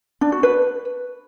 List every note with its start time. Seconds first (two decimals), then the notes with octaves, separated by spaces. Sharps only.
0.21 D4
0.32 F#4
0.43 B4